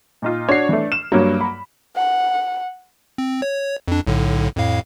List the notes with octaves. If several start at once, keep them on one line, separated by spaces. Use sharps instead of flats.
A#2 D#4 F4
D4 F#4 C#5 C7
E3 A3
F6 E7
G2 F#3 A#3 C#5
B5
F#5
C4
C#5
F2 D4
B1 A2 D3
F2 A2 F5